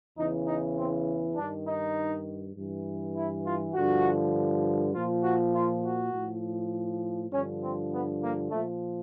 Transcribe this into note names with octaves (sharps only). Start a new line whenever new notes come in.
E2 C#3 E3 D#4
D#4
C4
G2 D#3 D4
D#4
G2 E3
E4
F4
G2 D3 F3 F#4
A#2 F3 F4
F#4
F4
F#4
A2 F3
G2 D3 F3 C#4
C4
B3
A#3
A#2 F3 A3